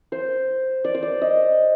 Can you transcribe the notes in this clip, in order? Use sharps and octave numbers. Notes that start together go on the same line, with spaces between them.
C5
D5
C5
D5
D#5